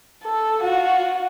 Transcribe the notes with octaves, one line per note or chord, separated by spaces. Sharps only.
A4
F4 F#4